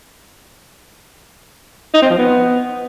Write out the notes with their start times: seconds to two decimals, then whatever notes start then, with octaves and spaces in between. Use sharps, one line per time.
1.94 D#4
2.02 C4
2.10 F3
2.18 B3